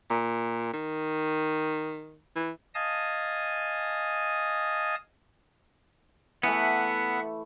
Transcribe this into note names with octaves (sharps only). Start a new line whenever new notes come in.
A#2
D#3
E3
D#5 F5 G#5 A5 D#6
E3 A3 B3 E5 F#5